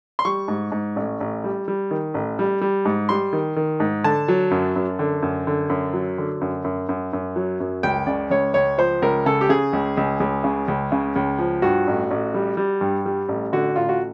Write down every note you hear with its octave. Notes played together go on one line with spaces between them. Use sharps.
C6
G3 C#6
G#2
G#2
A1
A1
G3
G3
D#3
A1
G3
G3
G#2
G3 C6
D#3
D#3
G#2
D3 A5
F#3
F#2
F#2
D3
F#2
D3
F#2
F#3
D3
F#2
F#2
F#2
F#2
F#3
F#2
C#2 G5
C#3 D5
C#2 C#5
C#2 C#5
F3 C5
C#2 A#4
C#3 A4
G4
C#3 G#4
C#2
C#2
C#2
C#3
C#2
C#3
C#2
F3
G2 F#4
A1
A1
G3
G3
G2
G3
A1
D3 F#4
A1 F4
F#4